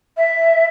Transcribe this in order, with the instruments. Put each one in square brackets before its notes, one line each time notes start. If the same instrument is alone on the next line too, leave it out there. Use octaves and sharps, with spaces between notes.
[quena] E5